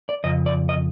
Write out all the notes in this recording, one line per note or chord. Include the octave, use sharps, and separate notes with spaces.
D5
F2 C#3 D#5
D5
D#5